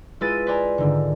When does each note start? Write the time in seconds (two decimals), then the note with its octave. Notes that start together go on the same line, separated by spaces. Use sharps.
0.21 G#3 E4 F4 B4 A6 D#7
0.47 B4 C5 D5 G#5 A#5
0.78 G#2 D3 D#3